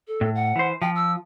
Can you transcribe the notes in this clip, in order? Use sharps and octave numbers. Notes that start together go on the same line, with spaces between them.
A4
A2
F#5
E3 C5
F3 G5
E6